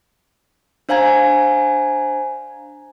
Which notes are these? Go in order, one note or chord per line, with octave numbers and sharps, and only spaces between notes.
D4 C5 F5 G#5 A#5 G#6